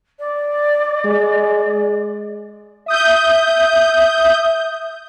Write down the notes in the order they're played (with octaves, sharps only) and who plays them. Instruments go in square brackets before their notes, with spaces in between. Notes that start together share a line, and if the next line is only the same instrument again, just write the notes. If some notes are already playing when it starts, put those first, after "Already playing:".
[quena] D5
[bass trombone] G#3
[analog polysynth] E5 D#6 G6